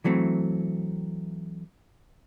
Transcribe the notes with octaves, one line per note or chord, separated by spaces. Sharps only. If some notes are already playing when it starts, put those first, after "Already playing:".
E3 F#3 A3 C4